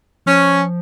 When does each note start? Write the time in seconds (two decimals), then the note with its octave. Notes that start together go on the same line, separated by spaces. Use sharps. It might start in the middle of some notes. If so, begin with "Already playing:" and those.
0.26 F3 C#4